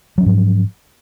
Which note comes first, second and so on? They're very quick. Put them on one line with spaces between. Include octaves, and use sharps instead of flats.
F#3 C#4 F3 G#2